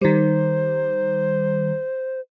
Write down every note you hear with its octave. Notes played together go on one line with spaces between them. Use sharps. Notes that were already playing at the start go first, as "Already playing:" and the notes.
D#3 G3 C5